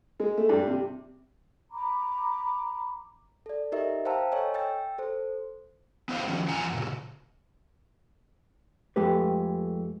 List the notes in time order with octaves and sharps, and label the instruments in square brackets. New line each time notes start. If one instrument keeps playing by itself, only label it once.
[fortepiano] G#3
A3
G2
C3
[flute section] A#5 B5 D6
[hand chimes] A4 D5
D#4 G4 A#4 D#5 E5
C5 F5 G5 A5 A#5 E6
A4 C#5 D#5 G#5 E6
G5 E6 A6
A4 C5
[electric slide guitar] B3 E4 C5 D#5 F5
D#3 F3 C#4
E2 F3 F#5 G#5 A#5
A#2 C#3
[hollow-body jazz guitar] F2 G#3 A3 G4 B4